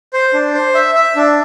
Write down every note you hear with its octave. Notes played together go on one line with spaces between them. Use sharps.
C5
D4
C5
E5
E5
D4